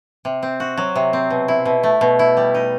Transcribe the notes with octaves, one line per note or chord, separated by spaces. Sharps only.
C3
C4
F#4
F#3
C3
C4
B2
E4
B2
A3
B2
E4
G3
D#4